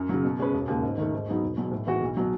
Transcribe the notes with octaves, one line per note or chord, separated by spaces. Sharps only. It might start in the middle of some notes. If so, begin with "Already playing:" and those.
Already playing: F#2
C#3 F#3
B2
G#3 C#4 G#4 B4
E1
D#2 C#3 G#3
G#2
D#3 A3
G#2
F#3 B3 D#4 G#4
E1
E2 B2 F#3
A2
E3 G#3 B3 F#4
B1
B2 F#3